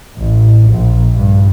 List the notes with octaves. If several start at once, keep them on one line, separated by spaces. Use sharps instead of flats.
A1
A#1
G2